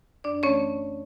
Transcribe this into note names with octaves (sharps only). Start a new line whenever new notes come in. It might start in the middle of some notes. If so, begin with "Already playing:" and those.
F#2 D4 D5
E3 A3 C#4 C#5